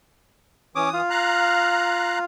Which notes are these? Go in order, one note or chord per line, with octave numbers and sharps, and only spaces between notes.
E3 C#4 D6 D#6
F4
F5 A#5 F#6